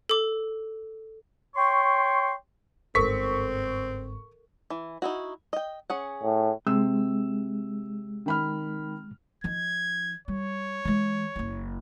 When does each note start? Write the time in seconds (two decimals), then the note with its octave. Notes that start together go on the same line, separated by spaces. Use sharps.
0.09 A4 D6
1.56 C#5 G5 C6 C#6
2.95 G1 G#2 C4 A4 A#4 C#6 B6
4.70 E3
5.02 D#4 E4 F#4
5.53 D#5 G5
5.90 C#4 G#4 F#5
6.24 A2
6.67 C3 G#3 E6
8.26 D#3 B5 F6
9.44 F3 D#4 G#6
10.28 G3 C#5
10.85 E3 G#3
11.36 F#1 E4